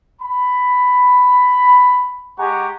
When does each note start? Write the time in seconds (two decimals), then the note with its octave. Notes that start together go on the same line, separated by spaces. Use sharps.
0.22 B5
2.38 G#3 G4 F#5 G#5 A#5 C#6